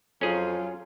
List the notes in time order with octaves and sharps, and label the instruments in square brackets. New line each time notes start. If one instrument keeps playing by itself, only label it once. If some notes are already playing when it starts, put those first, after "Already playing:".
[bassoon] F2 [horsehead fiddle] F#3 F4 [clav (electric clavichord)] C#4 G#4